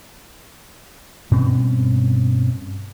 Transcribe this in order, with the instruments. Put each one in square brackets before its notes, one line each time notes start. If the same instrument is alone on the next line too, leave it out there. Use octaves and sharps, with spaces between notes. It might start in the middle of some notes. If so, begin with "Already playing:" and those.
[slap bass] G2 B2 C4 C#4